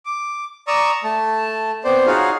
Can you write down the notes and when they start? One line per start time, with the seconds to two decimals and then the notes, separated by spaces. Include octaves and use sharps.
0.05 D6
0.67 D5 A#5 C#6 D#6 E6
1.04 A3 A5
1.84 B3 C4 C5 D5
2.07 D#4 F4 F#4 G#4 C#5 F5